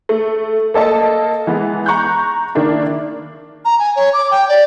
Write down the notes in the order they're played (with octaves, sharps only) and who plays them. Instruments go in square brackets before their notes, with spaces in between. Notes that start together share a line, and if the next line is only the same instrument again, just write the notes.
[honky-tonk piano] A3
A#3 A4 D#5 A5
E3 G#3 B3
A#5 C#6 F#6 G6
D#3 A#3 D4 E4
[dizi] A#5
G#5
C#5
D6
G5
D5